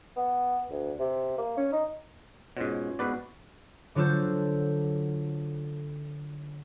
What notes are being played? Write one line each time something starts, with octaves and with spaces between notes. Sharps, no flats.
B3
D2
C3
A#3
C#4
D#4
G#2 B2 C#4 F4 C#5
G#2 B3 F#4 B4 D5
D3 F#3 F4 A4 C5